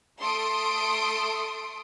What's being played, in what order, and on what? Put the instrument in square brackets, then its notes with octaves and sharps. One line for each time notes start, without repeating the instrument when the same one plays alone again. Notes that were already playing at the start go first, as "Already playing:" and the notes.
[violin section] A3 A4 C6 D#6 D7